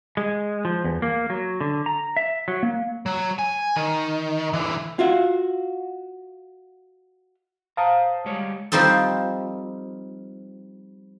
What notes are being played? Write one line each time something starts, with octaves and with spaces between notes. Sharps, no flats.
G#3
F3
E2
A#3
F#3
D3
A#5
E5
F#3
A#3
F#3
G#5
D#3
D3 E3
F4 F#4 E5
C5 F5 A5 A#5 D#6
G3 G#3 C#5
F3 G3 C4 D#4 A4